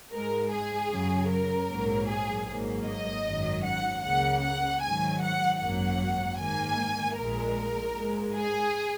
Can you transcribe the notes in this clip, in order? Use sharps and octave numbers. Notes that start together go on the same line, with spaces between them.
G#2 G#3 A#4
G#4
F#2 C#3 F#3
A#4
A#1 G#2 F#3 A#3
G#4
G#1 G#2 F#3 A#3
D#5
G#1 F#2 D#3 F#3
F#5
C#2 C#3 A#3 F#5
F#5
G#2 D#3 F#3 G#5
F#5
G#1 F#2 F#3 A#3 F#5
G#2 D#3 A#3 G#5
A#1 A#2 G#3 A#4
G#2 G#3
G#4